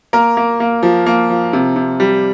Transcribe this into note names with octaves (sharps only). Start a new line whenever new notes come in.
A#3 A#4
A#3
A#3
F3
A#3
F3
C3
C3
G3